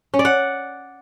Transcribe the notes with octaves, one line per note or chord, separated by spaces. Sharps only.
C#4
D5
F#5